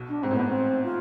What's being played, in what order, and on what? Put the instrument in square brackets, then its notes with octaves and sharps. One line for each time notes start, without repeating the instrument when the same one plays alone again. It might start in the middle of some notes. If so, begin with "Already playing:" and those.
Already playing: [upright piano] B1 B2
[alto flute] D4
[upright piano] G#2 [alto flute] C4
[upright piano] A2
[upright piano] G#2 [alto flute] B3
[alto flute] C4
F4